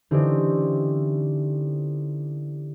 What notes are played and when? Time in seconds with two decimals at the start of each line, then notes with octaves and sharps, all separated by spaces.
0.11 D3 E3 C4 C#4 D#4 G4